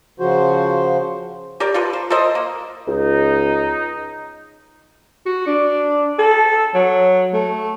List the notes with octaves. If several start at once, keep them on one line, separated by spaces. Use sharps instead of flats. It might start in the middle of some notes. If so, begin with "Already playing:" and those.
C#3 F3 F#4 C5
G4 A#4 D5
F4 A4 B4
C5
A4 A#4 C5 D#5
A#3
C#2 D#4
F#4
D4
A4
F#3
A3